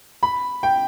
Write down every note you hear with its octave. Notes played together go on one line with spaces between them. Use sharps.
B5
G5